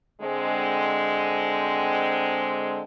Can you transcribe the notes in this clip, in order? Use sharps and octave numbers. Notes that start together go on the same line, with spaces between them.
D3 G#3 C4